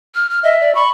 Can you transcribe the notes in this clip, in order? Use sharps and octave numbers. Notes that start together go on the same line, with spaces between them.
F6
F6
D#5 E5
D5
B5 C#6